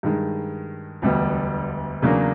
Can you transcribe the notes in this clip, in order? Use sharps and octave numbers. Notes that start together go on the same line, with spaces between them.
G2 D#3 G#3
E1 D2 D3 G3 B3
E2 C#3 F#3 A#3 D4